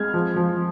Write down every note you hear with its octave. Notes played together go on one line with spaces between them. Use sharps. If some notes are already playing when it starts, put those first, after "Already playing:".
Already playing: G#3 F6 G#6
F3
F3